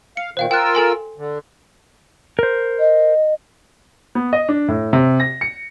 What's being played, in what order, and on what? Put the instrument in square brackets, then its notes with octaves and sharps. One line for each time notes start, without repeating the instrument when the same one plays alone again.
[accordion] F5 [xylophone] C#7
[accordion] A#2 D#3 [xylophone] C5 F5 G5
[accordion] F4 A#4 E6 [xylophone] G5 F#6
[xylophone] A4 G#5 C6
[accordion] D3
[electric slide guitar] A#4 C5
[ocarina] D#5
[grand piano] B3
D#5
D4
A2
C3
A#6
C#7